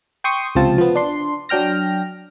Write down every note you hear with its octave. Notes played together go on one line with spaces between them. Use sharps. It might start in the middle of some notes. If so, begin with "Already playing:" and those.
G5 C6 C#6 D#6
C#2 C3 F3 C4 F4 A5
F3 B3
D4 C6
F#3 D4 G5 F6 A#6